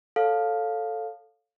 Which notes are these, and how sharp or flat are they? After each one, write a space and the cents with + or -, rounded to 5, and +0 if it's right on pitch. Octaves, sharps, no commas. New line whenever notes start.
A4 +0 C#5 +0 F5 +10